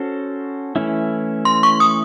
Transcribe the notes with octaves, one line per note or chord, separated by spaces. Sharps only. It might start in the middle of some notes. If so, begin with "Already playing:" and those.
Already playing: C#4 F#4 A4 C5
E3 A3 C#4 E4
C6
C#6
D#6